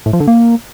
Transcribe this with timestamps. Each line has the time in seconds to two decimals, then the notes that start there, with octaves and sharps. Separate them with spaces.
0.06 A2
0.13 F3
0.20 D3
0.27 A#3